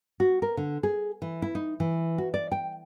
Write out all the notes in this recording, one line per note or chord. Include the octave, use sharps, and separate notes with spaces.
F#4
A#4
D3
G#4
E3
E4
D#4
E3
F#4
D5
G5